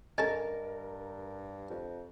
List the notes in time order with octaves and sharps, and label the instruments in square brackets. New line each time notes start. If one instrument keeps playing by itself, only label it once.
[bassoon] G2 [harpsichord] C#4 A4 [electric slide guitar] A#4 [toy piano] D#5
[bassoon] F2